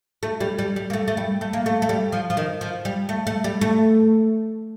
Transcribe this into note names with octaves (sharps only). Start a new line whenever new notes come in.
A3
G3
G3
G3
A#3
A3
A3
G3
A3
A#3
A3
A3
G3
F3
F3
D#3
F3
G3
A3
A3
G3
A3